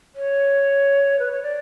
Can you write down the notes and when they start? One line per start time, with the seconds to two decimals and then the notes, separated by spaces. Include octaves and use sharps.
0.15 C#5
1.19 B4
1.31 C#5
1.43 D5